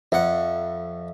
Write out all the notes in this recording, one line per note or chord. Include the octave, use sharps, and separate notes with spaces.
F2 E5 F#5